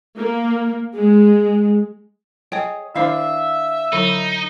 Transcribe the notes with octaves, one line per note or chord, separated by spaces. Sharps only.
A#3
G#3
G#4 C#5 D#5 G5 G#5
D#3 D4 E4 C5 E5 F5
D3 F#3 D#4 E4